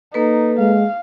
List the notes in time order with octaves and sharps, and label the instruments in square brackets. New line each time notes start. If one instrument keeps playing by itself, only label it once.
[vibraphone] A#3 A4 B4 [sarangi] D#4
[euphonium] G#3 [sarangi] F5